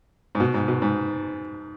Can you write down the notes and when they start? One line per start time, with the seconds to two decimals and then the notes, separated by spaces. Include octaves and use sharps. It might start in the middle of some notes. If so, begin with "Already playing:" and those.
0.35 G#2
0.40 B2
0.54 G#2
0.68 B2
0.82 G#2